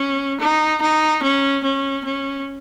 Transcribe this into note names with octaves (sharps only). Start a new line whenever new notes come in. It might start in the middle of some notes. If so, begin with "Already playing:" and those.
Already playing: C#4
D#4
D#4
C#4
C#4
C#4